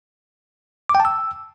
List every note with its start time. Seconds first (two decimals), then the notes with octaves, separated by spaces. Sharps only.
0.89 D6
0.95 G5
1.00 A5
1.05 E6